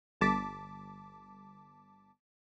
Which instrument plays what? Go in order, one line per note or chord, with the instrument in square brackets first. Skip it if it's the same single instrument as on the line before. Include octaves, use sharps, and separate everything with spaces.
[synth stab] G1 A5 D6 B6